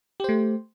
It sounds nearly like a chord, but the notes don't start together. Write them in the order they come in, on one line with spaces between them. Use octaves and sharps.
G4 C5 A3